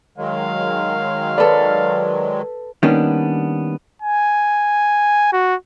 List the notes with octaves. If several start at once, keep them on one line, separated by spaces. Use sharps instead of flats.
D#3 F#3 G#3 F5
A4 B4 D5
D#3 G3 A#3 B3 C#4 D4
G#5
F#4